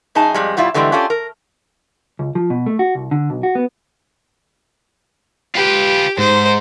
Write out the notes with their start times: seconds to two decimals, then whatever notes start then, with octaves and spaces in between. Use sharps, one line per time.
0.15 F#2 D#4 G#4 A5
0.34 F2 G3 G#3
0.57 B2 G3 E4 F4
0.74 A2 D3 E3 G3 G#3
0.92 C#4 D4 F4 G4 A4
1.10 A#4
2.19 C#2
2.35 F3
2.50 B2
2.66 A3
2.79 F#4
2.95 C2
3.11 D3
3.30 B1
3.43 F#4
3.55 B3
5.55 F4 G4 B4
6.18 G#2 C5